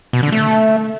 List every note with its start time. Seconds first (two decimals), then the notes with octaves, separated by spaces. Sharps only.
0.13 B2
0.23 D3
0.32 A3